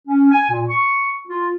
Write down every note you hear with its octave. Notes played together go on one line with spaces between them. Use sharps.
C#4
G#5
A#2
C#6
F4